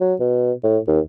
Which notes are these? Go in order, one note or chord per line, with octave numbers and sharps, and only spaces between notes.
F#3
B2
A2
D#2